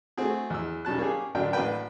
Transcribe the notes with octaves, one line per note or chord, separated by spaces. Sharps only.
A3 C4 F#4 G#4
E2 E3 E6
B1 G3 C#4 A5 F#6
A#3 C#4 G4 G#4
A1 F#2 D3 F#3 D4 G5
A1 A#3 D4 F#4 B4 G5